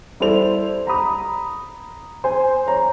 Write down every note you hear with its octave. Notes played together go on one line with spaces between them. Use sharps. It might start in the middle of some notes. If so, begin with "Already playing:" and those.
G3 E4 A4 C5 F7
A#5 B5 D#6
C5 G#5
C#5 A#5